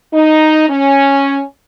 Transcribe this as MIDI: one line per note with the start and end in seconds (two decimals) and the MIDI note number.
0.13 0.69 63
0.69 1.41 61